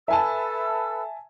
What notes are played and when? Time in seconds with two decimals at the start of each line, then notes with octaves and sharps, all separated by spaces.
0.08 A4 B4 E5 G#5 A5 E6